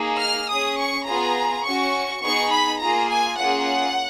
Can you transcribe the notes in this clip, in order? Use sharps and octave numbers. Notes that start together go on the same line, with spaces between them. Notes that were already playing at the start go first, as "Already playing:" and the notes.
Already playing: A#3 D#4 G#4
F6
C#4 G#4 D#6
C#6
B3 F4 G#4 A#5
C#4 F#4 C#6
B3 D#4 G#4 C#6
B5
A#3 F4 G#4 A#5
G#5
A#3 C#4 F4 G#4 F#5